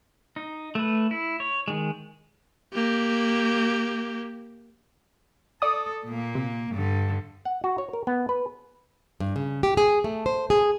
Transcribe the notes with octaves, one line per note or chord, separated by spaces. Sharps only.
D#4
A3 B4
E4
C#5
D#3 G#3
A#3 G4
A4 D5 D#6
A#2 A#3
C3
G2 D3
F#5
F#4
C#5
A#4
B3
B4
G2
C#3
G4
G#4
A3
C5
G#4